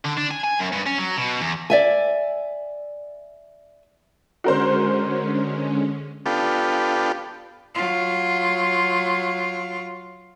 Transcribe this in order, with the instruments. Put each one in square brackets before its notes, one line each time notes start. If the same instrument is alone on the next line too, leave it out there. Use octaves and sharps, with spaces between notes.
[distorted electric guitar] D3
D4
G#5
G#5
F#2
G2
C#4
F#3
B2
E2
[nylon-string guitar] D5 E5 G#5
[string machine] D3 G#3 C#4 [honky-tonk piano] F#4 A#4 C5
[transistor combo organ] B3 D4 F4 G4 A4
[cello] F#3 F4